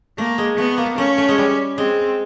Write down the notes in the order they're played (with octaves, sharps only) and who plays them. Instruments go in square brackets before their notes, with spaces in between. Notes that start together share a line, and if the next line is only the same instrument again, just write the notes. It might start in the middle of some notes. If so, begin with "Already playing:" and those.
[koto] A3 [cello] A#3
[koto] G#3
[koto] A3 [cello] B3
[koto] A#3
[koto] A3 [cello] C#4
[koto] A3
G#3
G3
[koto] G#3 [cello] C4